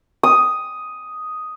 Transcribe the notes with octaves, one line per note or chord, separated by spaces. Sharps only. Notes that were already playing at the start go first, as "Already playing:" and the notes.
D#6